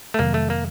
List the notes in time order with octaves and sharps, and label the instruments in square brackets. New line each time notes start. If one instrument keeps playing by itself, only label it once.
[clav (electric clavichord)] A3
[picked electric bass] F2 C3 D#3 F#3 [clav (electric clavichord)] A#3
[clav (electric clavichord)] A3
A#3